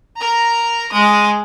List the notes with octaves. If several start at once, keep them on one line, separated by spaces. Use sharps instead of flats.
A#4 A#5
G#3 D#6